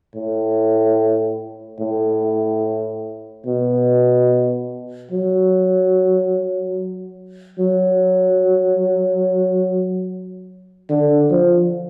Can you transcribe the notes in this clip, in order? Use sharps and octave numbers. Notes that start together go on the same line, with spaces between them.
A2
A2
B2
F#3
F#3
D3
F3